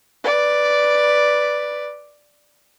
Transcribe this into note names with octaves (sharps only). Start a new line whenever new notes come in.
B4 D5